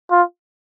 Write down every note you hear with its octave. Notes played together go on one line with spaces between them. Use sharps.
F4